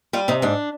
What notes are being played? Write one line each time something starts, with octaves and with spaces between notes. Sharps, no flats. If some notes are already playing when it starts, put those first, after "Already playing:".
G3 F4
C3 D#4
G#2 D4